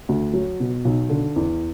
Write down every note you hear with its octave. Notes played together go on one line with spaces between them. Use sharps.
D2
F#3
B2
B1
D3
E2